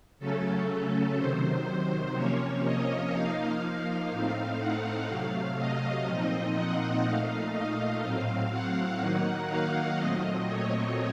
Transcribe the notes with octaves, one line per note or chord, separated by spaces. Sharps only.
C#3 F#3 A3 C#4 A4
A4
C3 D#3 F#3 C5
C3 F3 A#3 C#4 C#5
D#5
F3 A#3 D#4 F5
F5
A2 A3 C4 D#4
F#5
C3 F#3 A3 F5
D#5
A#2 F3 C4 D#4
F#5
A#2 A3 D#4 F5
D#5
A2 F#3 C4 F5
F#5
D#3 F#3 A#3 D#4
F5
A#2 F#3 A3 C4 D#5
C#5